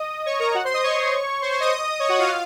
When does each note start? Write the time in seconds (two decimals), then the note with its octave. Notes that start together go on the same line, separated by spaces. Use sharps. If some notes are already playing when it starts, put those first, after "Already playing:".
Already playing: D#5 D#6
0.26 C#5 C#6
0.40 A#4 A#5
0.55 F#4 F#5
0.65 C5 C6
0.74 D#5 D#6
0.83 C#5 C#6
1.41 C5 C6
1.51 C5 C6
1.60 D#5 D#6
1.99 C#5 C#6
2.09 F#4 F#5
2.19 F4 F5